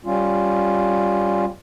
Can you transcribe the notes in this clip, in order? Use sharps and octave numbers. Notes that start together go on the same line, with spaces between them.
G3 C#4 F4